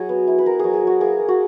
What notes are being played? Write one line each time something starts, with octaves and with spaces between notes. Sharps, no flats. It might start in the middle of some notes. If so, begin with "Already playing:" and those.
Already playing: F#3 E4 G#4
B3
E4
B4
B3 A#4
F#3 G#4
G#4
F#3 F#4
A#3 G#4
A#3
F#4